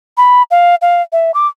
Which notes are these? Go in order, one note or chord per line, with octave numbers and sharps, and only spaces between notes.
B5
F5
F5
E5
D6